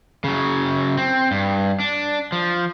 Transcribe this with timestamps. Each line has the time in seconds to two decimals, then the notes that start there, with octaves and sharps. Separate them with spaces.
0.24 C#3 F#3
0.97 C4
1.31 G2
1.80 D4
2.32 F3